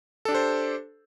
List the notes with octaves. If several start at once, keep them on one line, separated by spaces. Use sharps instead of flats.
D4 G4 A4 C5